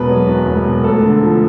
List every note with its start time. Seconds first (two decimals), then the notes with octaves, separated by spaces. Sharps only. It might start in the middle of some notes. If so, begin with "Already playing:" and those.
Already playing: E1 B2 B4
0.09 F#3
0.27 E2
0.46 E1
0.65 B2
0.84 F1 A4
1.03 D3
1.23 F3